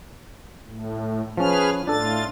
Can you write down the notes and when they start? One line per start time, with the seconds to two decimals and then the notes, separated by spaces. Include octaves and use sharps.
0.63 A2
1.37 F3 C#4 G#4 B4 F6
1.87 A2 D4 F4 A4 A6